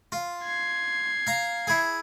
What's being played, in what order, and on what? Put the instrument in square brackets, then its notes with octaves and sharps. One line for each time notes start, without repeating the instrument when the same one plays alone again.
[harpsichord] F4
[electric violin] G#6 C7
[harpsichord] F5 A#5
E4 G#4